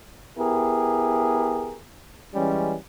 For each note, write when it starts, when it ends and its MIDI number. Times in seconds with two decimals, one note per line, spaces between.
0.39 1.77 59
0.39 1.77 64
0.39 1.77 67
0.39 1.77 68
0.39 1.77 70
2.34 2.75 52
2.34 2.75 55
2.34 2.75 56
2.34 2.75 61